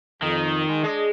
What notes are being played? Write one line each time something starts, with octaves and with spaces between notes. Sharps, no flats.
F2 D#3
G#3
G#3 D4 D#5